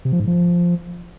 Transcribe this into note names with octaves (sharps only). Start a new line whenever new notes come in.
C3
F3
G#2
F3